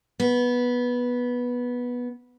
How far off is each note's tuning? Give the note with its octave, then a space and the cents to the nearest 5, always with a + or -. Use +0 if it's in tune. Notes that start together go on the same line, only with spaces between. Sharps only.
B3 -10